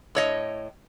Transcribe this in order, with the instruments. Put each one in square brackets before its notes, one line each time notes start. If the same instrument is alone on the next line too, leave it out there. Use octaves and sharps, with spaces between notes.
[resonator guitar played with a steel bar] A2 C#5 D#5